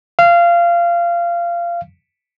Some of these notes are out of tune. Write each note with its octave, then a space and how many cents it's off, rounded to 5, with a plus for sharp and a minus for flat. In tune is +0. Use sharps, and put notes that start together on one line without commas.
F5 -20